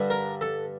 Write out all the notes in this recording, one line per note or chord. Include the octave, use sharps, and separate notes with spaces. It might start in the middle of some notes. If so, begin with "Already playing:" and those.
Already playing: G2 D3 G3
A#4
A4